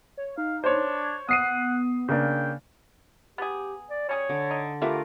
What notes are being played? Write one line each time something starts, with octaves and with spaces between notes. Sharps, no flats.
C#5
D#4 F5
D4 C5 C#5
G#6
B3 F#5 D#6 C7 D#7
C#3 A#3 D4 G5
B3 G4 G#4
D5
G3 C#4 G#4 C#5
D3
D#4
E3 A3 F4 G4 A#4 E5 F#5